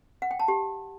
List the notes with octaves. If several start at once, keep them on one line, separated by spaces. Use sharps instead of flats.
F#5
G5
A5
G4